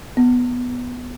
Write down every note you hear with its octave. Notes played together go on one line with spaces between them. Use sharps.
B3